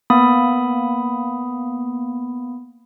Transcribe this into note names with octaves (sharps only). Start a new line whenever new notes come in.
A#3 B3 B5 D#6